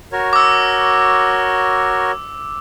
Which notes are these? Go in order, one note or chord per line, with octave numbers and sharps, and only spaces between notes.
F#4 A#4 C#5
D6 E6